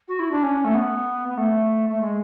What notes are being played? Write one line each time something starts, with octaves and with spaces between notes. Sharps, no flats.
F#4
E4
D4
C#4
A3
B3
B3
A3
A3
G#3